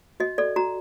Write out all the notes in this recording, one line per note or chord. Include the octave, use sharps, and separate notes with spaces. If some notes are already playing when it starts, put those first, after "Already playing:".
F#4 D#5
A4 D5
F#4 A#5